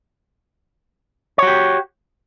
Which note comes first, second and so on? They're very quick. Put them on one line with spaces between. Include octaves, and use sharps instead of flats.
C#5 F#4 G4